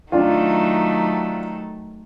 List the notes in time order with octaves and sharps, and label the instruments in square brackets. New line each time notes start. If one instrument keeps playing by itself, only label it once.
[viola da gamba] D#3 F#3 A3 [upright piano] D4 F4